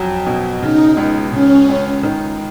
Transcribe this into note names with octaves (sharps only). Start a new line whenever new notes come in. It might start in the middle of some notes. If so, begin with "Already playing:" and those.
Already playing: F2 F#3
B2
C#3 D#4
C#2
C#3 C#4
C#2
D#3